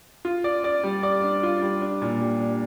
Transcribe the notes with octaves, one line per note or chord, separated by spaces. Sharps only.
F4
D5
D5
G3
D5
D4
F4
G3
D4
A#2
G3
D4